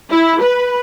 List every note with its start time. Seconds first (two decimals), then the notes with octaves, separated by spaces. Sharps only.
0.10 E4
0.41 B4